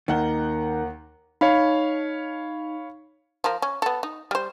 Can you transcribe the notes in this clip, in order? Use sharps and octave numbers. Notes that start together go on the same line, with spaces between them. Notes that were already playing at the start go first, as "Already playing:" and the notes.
D#2 D#3 A#4 F#5 A#5 G7
D#4 C#5 F5 B5
F3 A#4
C#4
B3 A4
D#4
G3 C5